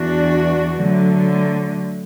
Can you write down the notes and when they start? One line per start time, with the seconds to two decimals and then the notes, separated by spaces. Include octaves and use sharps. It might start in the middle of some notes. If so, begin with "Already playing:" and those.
Already playing: E2 E3 D4 F#4
0.81 D3 F#3 A3